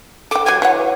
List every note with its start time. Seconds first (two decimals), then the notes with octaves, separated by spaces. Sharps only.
0.31 A4 G5 D6
0.46 F#3 G4 G#6
0.62 E3 C#5 F#5